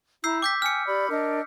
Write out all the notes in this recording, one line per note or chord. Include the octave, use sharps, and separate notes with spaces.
E4 A#5 E6 G6 C7
G5 D6 G6 B6
G5 G#5 F6 C#7
G4 D5 B5
D4 A#4 D#5